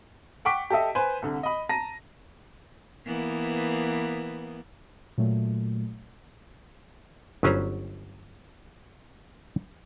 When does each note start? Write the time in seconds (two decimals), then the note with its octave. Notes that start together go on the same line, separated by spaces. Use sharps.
0.45 F#5 G5 C#6 D6 B6 D7
0.70 G4 A4 D#5 E5
0.95 B4 C5 G#5
1.22 C2 D3
1.43 D#5 B5
1.69 A5 A#5 A#6 D#7
3.06 E3 A#3 B3
5.18 A#2 F#3 A3
7.43 G1 F#3 C#4 B4 C5 A#5